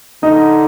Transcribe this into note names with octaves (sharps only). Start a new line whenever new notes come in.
D3 D#4 D#5